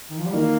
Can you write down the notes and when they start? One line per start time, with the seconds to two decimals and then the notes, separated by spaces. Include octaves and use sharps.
0.10 D#3
0.18 F3
0.26 G3
0.33 D#3 A#3